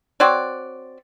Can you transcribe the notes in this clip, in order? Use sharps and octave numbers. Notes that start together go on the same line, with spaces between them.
C4 F#4 C#5 D5